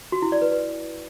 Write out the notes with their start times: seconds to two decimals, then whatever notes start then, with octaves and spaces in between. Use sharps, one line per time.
0.12 F#4
0.22 E4
0.32 D5
0.42 B4
0.52 B4